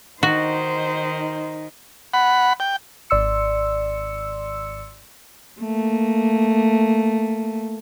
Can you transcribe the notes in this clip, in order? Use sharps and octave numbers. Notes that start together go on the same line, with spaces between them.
D#3 D#4 F#4 C5
F#5 B5
G5
G#1 D5 C6 E6 C#7
A3 A#3